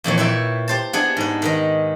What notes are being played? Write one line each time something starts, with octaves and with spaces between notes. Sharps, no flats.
F2 A#2 E3 C#5
A#2 E4 B4 E5 G5
G4 C5 A5
B3 D4 G#4 F#5 G#5
G#2 B4
D#3 B4 D#5